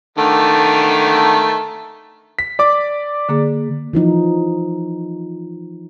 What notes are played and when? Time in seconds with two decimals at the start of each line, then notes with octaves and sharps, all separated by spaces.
0.18 D3 D#3 A3
2.39 B6
2.59 D5 D6
3.29 D3 A#3 G#4
3.93 E3 F3 D#4